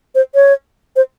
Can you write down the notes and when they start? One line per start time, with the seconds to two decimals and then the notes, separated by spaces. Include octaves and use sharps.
0.15 C5
0.35 C#5
0.96 C5